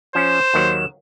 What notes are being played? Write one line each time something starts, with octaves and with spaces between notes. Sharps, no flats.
F3 C#4 C5 E7
D#2 D#3 F#3